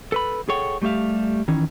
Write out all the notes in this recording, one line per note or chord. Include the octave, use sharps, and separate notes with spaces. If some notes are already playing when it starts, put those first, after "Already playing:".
A4 B4 B5
G#4 A4 C#5 F#5 G5
G3 A3 G4 E5 F5
D#3 E3 C#4